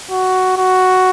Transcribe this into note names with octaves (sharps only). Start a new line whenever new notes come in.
F#4
F#4